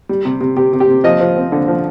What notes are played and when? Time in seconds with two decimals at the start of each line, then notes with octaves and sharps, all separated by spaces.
0.09 G3
0.25 C3
0.40 C3
0.56 C3 G4
0.73 C3
0.80 G4
0.89 C3
1.04 F3 D#5
1.20 F3
1.36 C4
1.52 D3
1.68 F3